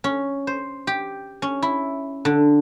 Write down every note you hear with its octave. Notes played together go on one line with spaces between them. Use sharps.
C#4
C5
G4
C#4
E4
D3